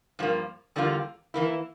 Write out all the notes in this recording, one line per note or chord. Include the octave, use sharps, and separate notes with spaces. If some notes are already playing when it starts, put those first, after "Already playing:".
G2 F3 A#3
E2 D3 G3 A#3 F4
E3 A#3 E4